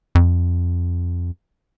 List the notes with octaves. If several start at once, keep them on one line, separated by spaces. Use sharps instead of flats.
F2